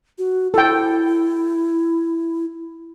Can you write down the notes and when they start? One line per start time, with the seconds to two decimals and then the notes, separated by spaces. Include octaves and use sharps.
0.18 F#4
0.54 E4 A4 G5